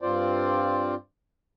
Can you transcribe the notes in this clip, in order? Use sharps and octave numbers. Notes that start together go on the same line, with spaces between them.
G2 C4 F4 C5 D5